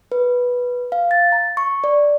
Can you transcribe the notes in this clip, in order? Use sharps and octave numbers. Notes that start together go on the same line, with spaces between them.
B4
F5
A6
A#5
C#6
D5